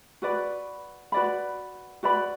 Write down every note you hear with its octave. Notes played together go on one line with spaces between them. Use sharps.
F#4 B4 D5 B5
F#4 B4 D5 B5
F#4 B4 D5 B5